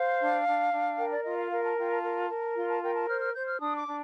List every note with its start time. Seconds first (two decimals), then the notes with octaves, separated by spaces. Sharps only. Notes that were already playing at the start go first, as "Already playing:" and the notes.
Already playing: C5 F5
0.20 D4
0.46 D4
0.72 D4
0.98 A#4 G5
1.12 D5
1.25 F4 D#5
1.37 F5
1.51 A#4 F5
1.64 A5
1.77 F4 G5
1.90 A5
2.03 A#4
2.30 A#4
2.55 F4 C6
2.69 A5
2.82 A#4 G5
2.95 A5
3.08 C5 F6
3.21 F6
3.34 C5 G6
3.47 F6
3.60 D4 D#6
3.78 D6
3.87 D4